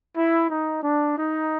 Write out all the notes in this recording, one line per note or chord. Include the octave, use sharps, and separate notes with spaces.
E4
D#4
D4
D#4